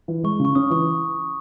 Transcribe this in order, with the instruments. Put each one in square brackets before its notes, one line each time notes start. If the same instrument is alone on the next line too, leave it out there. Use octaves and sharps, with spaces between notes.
[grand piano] E3
[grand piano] G#3 [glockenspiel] C#6
[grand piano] C#3
[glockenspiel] C#6
[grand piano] C#4 [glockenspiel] D#6
[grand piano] E3 [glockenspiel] C#6